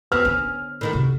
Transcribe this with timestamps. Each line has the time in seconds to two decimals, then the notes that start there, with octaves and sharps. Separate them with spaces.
0.12 B3 C4 F#4 F6
0.25 D3 B3 C#4
0.81 A2 D#3 A3
0.93 F#2 C3 F#4